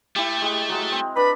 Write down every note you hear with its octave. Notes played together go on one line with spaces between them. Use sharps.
A3 E4 G4
G#3 G4
F#3 G#3
C4
D4 B4 B5